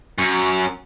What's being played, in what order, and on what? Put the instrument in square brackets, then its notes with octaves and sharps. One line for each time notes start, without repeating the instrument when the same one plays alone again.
[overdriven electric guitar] F#2